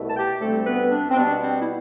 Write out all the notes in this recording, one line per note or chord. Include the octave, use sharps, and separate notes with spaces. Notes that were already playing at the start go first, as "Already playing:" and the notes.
Already playing: C2 B2 A3
A5
G4 G5
D2 C3 G3 A3 C4 A4
B3 B4
D4
C4
B2 G3 B3 D4
C4
E4